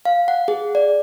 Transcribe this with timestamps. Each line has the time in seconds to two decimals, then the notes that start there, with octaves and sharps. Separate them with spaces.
0.05 F5
0.28 F#5
0.48 G#4
0.75 D5